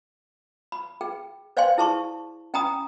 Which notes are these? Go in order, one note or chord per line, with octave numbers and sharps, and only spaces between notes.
B5
G#4 G5
C5 D5 F5 G5 G#5 C6
E4 G#4 A5 C6 C#6
C#4 G5 G#5 A#5 B5 D#6